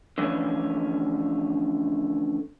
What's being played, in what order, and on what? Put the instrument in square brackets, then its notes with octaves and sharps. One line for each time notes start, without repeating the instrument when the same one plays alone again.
[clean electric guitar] D3 E3 F3 A3 C#4